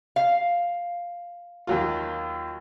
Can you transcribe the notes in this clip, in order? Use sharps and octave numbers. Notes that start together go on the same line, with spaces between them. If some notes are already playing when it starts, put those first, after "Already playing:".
F5
D#2 F#3 F4